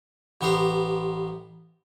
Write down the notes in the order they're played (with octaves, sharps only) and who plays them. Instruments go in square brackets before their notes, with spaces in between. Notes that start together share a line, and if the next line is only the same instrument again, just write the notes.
[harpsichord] A1 B3 G4 C5 A#5 C6